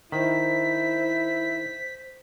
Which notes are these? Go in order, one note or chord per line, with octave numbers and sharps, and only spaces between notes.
D#3 E4 C5 B6